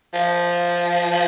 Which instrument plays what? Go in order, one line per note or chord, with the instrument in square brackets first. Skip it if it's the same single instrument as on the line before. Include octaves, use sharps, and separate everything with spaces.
[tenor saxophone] F3